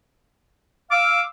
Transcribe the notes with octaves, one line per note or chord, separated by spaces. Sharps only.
F5 D6 E6